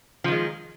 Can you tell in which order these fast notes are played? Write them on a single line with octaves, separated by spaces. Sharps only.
F3 D#3 G#3